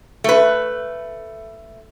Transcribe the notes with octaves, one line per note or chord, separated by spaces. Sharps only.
A3 B4